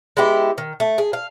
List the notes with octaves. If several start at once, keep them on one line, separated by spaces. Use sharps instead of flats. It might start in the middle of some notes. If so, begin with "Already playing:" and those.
G#3 B3 E4 G4
D#3
A3
G#4
F5